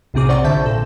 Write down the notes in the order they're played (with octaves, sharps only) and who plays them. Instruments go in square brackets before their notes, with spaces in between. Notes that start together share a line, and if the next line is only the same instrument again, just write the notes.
[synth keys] B1 A2 C3 C4 G#4 D6
C5 D5 F#5 A#5 C#6 A6
A#1 D3 E5 A5 G6
A#2 A4